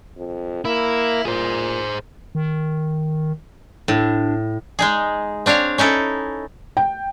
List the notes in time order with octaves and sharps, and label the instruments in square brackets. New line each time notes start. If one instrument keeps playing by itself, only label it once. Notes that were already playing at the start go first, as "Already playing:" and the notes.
[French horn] F2
[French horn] A#3 [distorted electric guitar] E4
[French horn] A#2 [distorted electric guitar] G#4 C5
[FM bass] D#3
[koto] A2 [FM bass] D4
[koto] G#3 D#4 G#4
C4 D4 C#5 F5
C#4 D#4 E4 A4
[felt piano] G5